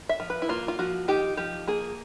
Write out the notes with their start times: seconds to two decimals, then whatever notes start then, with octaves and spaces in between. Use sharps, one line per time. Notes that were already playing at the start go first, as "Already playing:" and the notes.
0.09 E5
0.20 F3
0.30 B4
0.42 E4
0.49 A#3 F4
0.68 F4
0.79 F3 F#4
1.08 D#4 G4
1.37 F3 G4
1.67 A#3 G#4